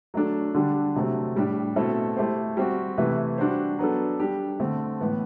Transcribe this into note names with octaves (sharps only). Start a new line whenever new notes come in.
F#3 A3 D4 A4
D3 G3 D4
C3 F#3 A3 C4
A2 G3 D4 G4
B2 A3 C4 E4 A4
A3 E4 G4 C5
G3 C4 F#4
C3 E3 A3 E4 B4
G3 D4 F#4 C5
F#3 B3 D4 A4
G3 D4 G4
D3 A3 C4
A2 E3 B3